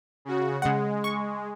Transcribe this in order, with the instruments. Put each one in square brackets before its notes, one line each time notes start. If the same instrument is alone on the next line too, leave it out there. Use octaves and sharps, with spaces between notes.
[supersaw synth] C#3 F#4
[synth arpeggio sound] C#3 F#5 [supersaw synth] G#3
[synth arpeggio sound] C#6